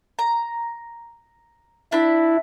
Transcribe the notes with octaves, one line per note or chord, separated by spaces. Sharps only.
A#5
D4 E4 B5